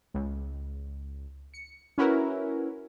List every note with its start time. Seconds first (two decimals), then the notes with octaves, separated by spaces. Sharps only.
0.14 C#2
1.54 C#7
1.98 C#4 E4 F#4 A#4 B4